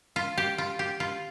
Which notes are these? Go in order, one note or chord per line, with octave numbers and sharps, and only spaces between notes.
F4
G4
F4
G4
F4